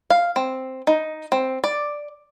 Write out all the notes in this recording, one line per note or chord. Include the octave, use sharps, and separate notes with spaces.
F5
C4
D#4
C4
D5